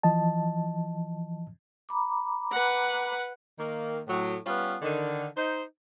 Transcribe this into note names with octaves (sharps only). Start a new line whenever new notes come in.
E3 F3 D#5 A5
A#5 B5 D6
B4 F#5
D#3 A#3
A2 F#3
G3 B3 C#4 F4
D3 D#3
D#4 C5